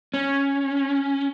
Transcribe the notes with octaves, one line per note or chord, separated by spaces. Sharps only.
C#4